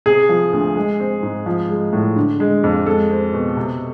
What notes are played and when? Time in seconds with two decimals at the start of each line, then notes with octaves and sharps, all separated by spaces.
0.06 C3 G#4
0.29 F3
0.53 D2
0.76 G#3
1.00 C4
1.23 G#2
1.46 F3
1.70 G#3
1.93 A2
2.16 D3
2.40 G#3
2.64 F2
2.86 G#3 A4
3.11 C4
3.34 B2
3.57 C3